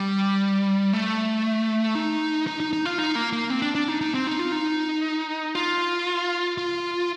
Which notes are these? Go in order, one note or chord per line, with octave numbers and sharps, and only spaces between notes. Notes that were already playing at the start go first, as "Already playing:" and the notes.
Already playing: G3
A3
D#4
D#4
D#4
D#4
F4
D#4
A#3
A#3
C4
D4
D4
D#4
D#4
C4
D#4
F4
D#4
F4
F4